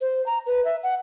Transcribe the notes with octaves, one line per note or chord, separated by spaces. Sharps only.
C5
A#5
B4
E5
F#5